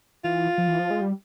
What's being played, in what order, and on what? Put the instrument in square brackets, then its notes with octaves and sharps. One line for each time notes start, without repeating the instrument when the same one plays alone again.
[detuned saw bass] E3 [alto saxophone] F4
[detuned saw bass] F3
E3
F3
G#3
G3